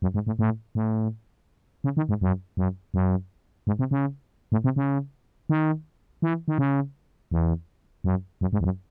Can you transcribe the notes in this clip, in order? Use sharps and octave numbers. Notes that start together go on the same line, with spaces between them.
F#2
G#2
A2
A2
A2
C#3
D#3
G#2
F#2
F#2
F#2
G#2
C3
C#3
A2
C3
C#3
D#3
E3
D#3
C#3
E2
F#2
F#2
G#2
E2
F#2